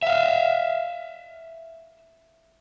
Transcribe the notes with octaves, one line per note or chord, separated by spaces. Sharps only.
E5 F5